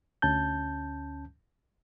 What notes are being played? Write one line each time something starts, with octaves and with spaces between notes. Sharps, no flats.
D2 C#4 A5 G6